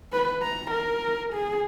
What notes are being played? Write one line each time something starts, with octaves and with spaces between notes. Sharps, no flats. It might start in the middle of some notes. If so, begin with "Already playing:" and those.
B4
A#5
A#4
G#4